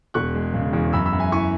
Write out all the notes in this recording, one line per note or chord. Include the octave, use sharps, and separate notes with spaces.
E1 C#6 F#6
G#3
C#3
E2
F#2 B5 E6
B5 E6
F#2
E5 G#5
E3 G#5 C#6